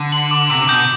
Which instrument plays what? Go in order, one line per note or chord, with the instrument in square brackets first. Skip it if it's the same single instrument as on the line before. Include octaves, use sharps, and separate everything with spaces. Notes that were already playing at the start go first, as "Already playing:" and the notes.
Already playing: [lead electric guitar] D3
[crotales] F#7
D6
[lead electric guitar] C3 [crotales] F#7
[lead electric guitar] B2 [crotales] G6